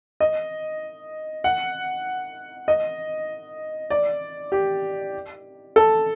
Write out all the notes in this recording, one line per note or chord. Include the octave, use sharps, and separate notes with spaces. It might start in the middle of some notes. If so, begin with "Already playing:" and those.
D#5
F#5
D#5
D5
G4
A4